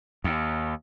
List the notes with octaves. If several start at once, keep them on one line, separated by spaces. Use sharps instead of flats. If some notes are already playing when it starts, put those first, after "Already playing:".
D#2